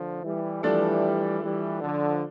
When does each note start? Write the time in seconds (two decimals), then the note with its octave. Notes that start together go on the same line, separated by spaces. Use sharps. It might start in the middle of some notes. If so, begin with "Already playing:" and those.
Already playing: D3 F3 A3
0.23 E3 G3
0.63 E3 F3 G3 A3 D4 A4 D5
1.42 E3 G3
1.81 D3 F3